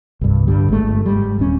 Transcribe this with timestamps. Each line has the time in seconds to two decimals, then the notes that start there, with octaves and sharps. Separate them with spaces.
0.21 C2 G2
0.47 G2 D3 G3
0.68 G1 G#3 A3
1.06 G#2 G3
1.39 D#1 C#4